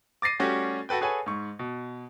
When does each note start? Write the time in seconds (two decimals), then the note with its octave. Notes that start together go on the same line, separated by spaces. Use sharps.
0.22 D6 A6 A#6 C7 D#7
0.39 G3 A3 C#4 F#4 G4
0.89 F#4 A4 B4 G5
1.01 G#4 A4 B4 C#5 F#5 G#5
1.26 G#2 C#6
1.59 B2